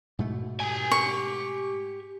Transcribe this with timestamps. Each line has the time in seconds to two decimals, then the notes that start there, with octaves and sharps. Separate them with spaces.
0.19 G#2 B2 A3
0.60 G4 G#5
0.91 C#6